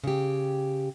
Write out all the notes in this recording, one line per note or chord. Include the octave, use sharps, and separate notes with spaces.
C#3 G4